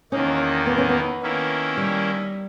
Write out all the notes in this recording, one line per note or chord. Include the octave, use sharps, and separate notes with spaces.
E2 D#3 A#3 C#4 D#4
B3
C#4
B3
D#3 A#3 C#4 E4
G3